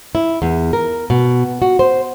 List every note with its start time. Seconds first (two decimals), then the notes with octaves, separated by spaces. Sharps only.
0.15 E4
0.42 E2
0.73 A#4
1.10 B2
1.62 F#4
1.79 C5